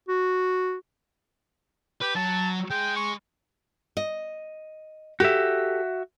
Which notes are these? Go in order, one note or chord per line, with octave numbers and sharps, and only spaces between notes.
F#4
G4 B4
F#3 A5
G#3 G5
C#6
D#5
F#4 G4 A4 E5